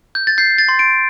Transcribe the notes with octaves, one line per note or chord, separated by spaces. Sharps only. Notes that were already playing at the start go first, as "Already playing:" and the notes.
G6
A6
G6 C7
A6
C6
D7